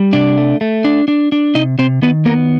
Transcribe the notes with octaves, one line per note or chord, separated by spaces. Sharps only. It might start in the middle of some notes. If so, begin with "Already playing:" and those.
Already playing: G3
C3 D4 D5
A3
A3
D4
D4
D4
C3 D#4 D#5
C3 C4 C5
D#3 B3 B4
A#3 B3 A#4